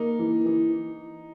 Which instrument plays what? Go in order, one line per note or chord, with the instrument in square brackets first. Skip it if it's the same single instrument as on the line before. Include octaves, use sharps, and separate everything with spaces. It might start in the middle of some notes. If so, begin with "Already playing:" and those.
Already playing: [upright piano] A#3 [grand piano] D#4
[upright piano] E3
E3